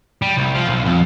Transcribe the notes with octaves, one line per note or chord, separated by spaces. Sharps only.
G3
C2
F3
B1
F2